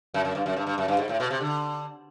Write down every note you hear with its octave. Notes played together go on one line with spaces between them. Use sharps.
F#2
F#2
G2
F#2
G2
G2
F#2
G2
G#2
A2
B2
C3
D3